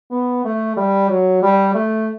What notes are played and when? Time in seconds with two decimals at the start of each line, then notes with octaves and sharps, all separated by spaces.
0.11 B3
0.45 A3
0.77 G3
1.09 F#3
1.42 G3
1.75 A3